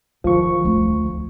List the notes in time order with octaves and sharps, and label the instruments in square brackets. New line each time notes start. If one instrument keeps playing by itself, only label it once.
[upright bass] D#3 [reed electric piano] F3 C#6
[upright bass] D2 A3